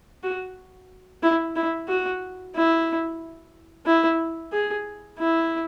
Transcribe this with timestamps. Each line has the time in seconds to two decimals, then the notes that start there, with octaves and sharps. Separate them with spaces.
0.23 F#4
1.23 E4
1.56 E4
1.88 F#4
2.55 E4
3.86 E4
4.52 G#4
5.19 E4